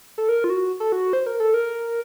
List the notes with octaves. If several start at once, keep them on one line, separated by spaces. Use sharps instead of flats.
A4
A#4
F4
F#4
A4
F#4
C5
A#4
A4
A#4